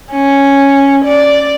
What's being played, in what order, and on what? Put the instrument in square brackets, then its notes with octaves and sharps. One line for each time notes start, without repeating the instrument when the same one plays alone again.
[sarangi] C#4
D5